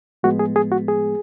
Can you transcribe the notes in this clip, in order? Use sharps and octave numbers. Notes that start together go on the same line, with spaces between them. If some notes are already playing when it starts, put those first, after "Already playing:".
A2 F3 G#3 B3 F#4
G#4
G#4
F#4
G#4